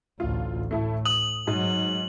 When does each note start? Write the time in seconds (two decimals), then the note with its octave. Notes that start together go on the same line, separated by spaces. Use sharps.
0.20 A1 D2 F4
0.71 A2 A3 E4 A4
1.05 D#6 F#7
1.47 G#2 F#3